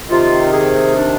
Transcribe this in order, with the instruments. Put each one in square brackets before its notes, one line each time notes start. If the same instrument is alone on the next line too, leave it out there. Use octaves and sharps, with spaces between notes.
[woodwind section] C3 D#3 F4
G#4
D4